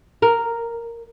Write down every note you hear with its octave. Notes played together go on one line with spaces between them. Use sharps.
A#4